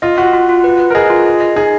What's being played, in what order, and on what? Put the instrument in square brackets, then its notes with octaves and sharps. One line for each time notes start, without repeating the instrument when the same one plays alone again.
[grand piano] F4 [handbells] D#5
[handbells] F4 [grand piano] F#4
[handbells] F4
F4
B4
B4
[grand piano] A#4
[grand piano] G#4 [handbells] D#5
[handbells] F4
D#5
D#5
[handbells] D#4 [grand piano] G#4